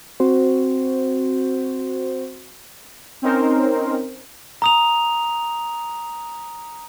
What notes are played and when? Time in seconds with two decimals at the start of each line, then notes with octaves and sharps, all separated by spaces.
0.20 C4 F#4 C5
3.22 C4 C#4 D#4 A#4 C5
4.62 A#5 D#6 F7